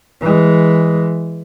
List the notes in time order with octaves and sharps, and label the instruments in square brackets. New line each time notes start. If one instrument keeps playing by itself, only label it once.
[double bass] E3 G#3